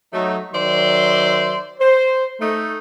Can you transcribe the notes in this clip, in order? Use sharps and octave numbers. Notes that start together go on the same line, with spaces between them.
F#3 A3 D#4
D#3 F#3 C5 D5 E5 C6
C5
A3 D#4